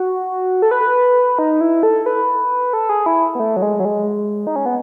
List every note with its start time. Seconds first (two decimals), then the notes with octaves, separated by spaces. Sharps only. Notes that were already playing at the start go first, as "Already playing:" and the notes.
Already playing: F#4
0.62 A4
0.71 B4
1.39 D#4
1.61 E4
1.83 A4
2.06 B4
2.73 A4
2.89 G#4
3.06 E4
3.35 B3
3.40 A3
3.57 F#3
3.62 G#3
3.80 F#3
3.85 G#3
4.47 D#4
4.56 C#4
4.66 B3